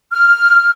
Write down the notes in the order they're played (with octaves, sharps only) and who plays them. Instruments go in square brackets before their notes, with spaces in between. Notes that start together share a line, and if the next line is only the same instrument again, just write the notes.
[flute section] F6